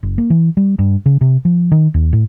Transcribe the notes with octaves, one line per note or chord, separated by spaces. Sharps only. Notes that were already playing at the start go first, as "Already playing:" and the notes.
F#1
A#3
E3
G3
G2
C#3
C3
F3
D#3
D#2
A2